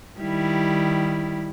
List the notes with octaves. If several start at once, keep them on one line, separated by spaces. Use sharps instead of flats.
D#3 G3 E4